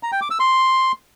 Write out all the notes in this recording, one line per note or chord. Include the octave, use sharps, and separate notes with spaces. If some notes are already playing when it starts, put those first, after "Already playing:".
A#5
G5
D6
E6
C6